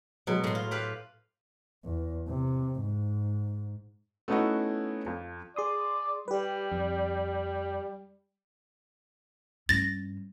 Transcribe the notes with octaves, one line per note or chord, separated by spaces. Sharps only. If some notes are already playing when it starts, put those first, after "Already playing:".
B2 F#3 G#3
A2 C6
F4
G4 B4 F5
E2
C3
G#2
A3 B3 C#4 D#4 E4 F#4
F2
G#4 D5 C6 D#6
G3 G4 B4
F2
G2 C#4 A6 A#6